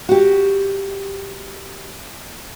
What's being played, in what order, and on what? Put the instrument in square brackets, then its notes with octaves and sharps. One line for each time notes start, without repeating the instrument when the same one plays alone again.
[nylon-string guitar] F#4 G4